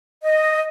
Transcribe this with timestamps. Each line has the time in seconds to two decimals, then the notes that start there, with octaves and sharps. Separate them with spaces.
0.23 D#5